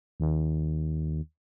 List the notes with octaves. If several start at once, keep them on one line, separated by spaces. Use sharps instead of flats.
D#2